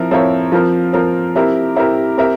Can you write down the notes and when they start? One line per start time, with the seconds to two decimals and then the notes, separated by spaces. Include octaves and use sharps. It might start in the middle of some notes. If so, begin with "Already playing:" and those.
Already playing: F3 C4 E4 A#4
0.11 F3 C4 E4 A#4 C#5
0.52 F3 C4 F4 A#4
0.93 F3 C4 F4 A#4
1.36 C4 E4 G4 A#4
1.76 C4 E4 G4 A#4
2.18 C4 G4 A#4 E5